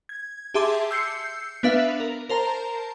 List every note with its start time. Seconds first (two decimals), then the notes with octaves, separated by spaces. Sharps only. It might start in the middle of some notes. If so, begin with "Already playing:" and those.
0.09 G#6
0.54 G4 G#4 E5 A5 C6 D6
0.91 E6 G6 C7 C#7
1.63 B3 D4 B4 E5 F5
2.00 A#4
2.29 A#4 C5 A5 A#5